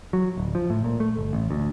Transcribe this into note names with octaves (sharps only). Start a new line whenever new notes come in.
F#3
D1
F3
A2
A#2
A3
G1
A1
D2